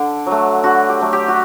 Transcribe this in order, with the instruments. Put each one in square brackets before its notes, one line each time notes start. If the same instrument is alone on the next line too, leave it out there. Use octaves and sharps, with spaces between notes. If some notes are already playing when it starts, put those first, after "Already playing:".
Already playing: [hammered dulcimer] D3
F#3 A3
D3 F#4
G4
F#3 A3
G4
F#4